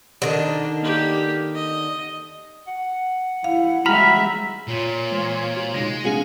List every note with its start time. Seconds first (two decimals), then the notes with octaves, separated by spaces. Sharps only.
0.22 D3 D#3 F#3 D4
0.80 A#3 G4
1.55 D#5
2.68 F#5
3.44 E4 F5
3.86 G3 G#3 F#4 E5 A#5 B5 F6
4.68 A#2 F4 C#5
5.11 E3 G#3 C5
5.56 F#4
5.74 C3 G#3 D#4 A#6
6.04 A3 C4 D4 F#4 G#4 F5 G#5